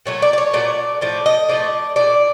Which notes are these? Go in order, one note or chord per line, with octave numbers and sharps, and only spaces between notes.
A#2 F#3 A3 C#5
D5
D5
C#5
A#2 F#3 A3 D5
A2 F3 A3 D5
D#5
A2 F3 A3 D5
A#2 F#3 A3 D5